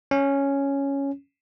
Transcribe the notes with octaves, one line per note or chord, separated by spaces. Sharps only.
C#4